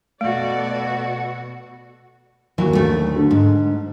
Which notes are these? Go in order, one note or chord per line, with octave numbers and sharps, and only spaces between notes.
B2 A3 F#4 A4 D5
D#2 E3 F#3 F#4
D2 A3
D3
G#2